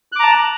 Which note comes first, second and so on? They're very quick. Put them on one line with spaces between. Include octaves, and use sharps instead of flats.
F#6 D6 A#5 A5